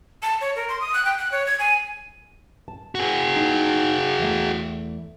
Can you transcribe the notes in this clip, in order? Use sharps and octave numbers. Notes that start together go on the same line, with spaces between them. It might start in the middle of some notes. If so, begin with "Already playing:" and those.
A5
C#5
A#4
C6
D#6
F#6
G5
F#6
C#5
G#6
G#5
A5
F#4 G#4
D#4
E2 A3